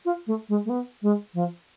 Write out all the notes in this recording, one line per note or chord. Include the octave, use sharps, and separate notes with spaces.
F4
A3
G#3
A3
B3
G#3
F3